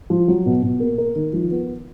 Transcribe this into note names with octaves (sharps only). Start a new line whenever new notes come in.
F3
F#3
B2
B2
A#3
A#4
D#3
F3
B3